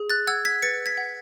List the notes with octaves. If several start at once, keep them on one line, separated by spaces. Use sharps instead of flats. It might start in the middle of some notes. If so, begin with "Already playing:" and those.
Already playing: G#4
F#6 A6
F#5 E6 G#6
G#6 B6
B4 A6 C#7
G#6 B6
F#5